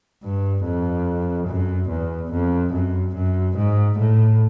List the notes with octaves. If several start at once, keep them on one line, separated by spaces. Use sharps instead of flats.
G2
F2
F#2
E2
F2
F#2
F#2
G#2
A2